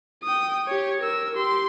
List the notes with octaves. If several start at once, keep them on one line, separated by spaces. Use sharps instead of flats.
G5 D#6
G4 C#5
A#4 E6
G4 C6